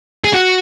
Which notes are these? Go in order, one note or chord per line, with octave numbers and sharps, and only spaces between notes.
G#4
F#4